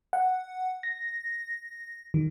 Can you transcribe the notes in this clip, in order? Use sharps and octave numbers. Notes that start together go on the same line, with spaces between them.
F#5
A#6
D#3